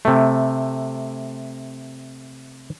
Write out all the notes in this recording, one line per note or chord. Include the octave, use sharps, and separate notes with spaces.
C3 A3